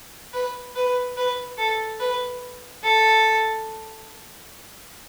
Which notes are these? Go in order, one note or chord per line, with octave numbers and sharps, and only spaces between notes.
B4
B4
B4
A4
B4
A4